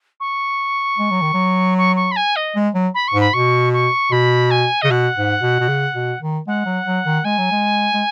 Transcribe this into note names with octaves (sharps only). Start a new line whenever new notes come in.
C#6
G#3
F#3
D#3
F#3
C#6
C#6
B5
G#5
D#5
G#3
F#3
B5
C#6
G#2
B5
B2 C#6
C#6
B2 B5
G#5
C#3 D#5
B2 F#5
G#2
B2
B2
C#3
B2
D#3
G#3 F#5
F#3
F#3
D#3
G#3 G#5
F#3
G#3
G#3